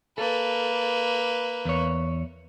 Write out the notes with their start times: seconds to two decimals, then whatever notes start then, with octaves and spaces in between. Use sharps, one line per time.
0.18 A#3 A4 B4
1.65 E2 C#5